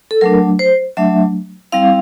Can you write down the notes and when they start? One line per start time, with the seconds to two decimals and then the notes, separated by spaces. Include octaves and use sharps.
0.11 A4
0.21 F#3 A3 D4 A#4
0.59 C5
0.97 F#3 A3 D4 E5
1.72 G3 C4 E4 F5